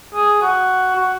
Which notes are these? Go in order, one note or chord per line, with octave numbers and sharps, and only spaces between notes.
G#4
F#4
F#4